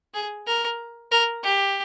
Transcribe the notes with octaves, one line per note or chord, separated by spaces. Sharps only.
G#4
A#4
A#4
G4